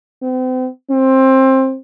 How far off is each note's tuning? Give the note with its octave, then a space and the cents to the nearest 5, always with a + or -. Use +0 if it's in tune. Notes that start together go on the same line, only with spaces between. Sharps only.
C4 -40
C4 +20